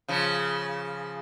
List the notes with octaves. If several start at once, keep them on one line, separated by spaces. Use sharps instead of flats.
C#3 F3